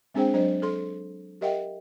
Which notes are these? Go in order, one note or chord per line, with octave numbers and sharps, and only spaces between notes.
G#3 C4 D4 G#4 C5 G5
F#3 D4 C5 D#5
A4 C6
G4 A#4 D#5 E5 F#5 G5